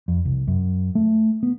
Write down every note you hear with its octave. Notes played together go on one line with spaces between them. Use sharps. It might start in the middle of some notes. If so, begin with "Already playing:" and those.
F2
C2
F#2
A3
B3